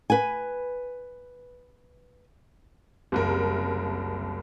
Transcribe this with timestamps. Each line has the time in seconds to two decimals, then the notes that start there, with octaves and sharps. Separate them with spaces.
0.10 B4 G#5
3.12 F#1 C2 A#4